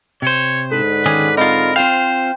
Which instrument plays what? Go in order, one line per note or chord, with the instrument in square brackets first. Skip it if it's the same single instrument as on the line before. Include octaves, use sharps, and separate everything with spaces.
[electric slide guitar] C3 C5 [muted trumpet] C#5
[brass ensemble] G#2 D3 [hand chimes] A4 [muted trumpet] B4
[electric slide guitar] D#3 C#4 G#4 [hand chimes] D6
[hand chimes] C4 D#5 B5 [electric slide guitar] D#4 F4 [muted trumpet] A#4
[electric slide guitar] C4 F4 F5 [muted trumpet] C5 [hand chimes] G5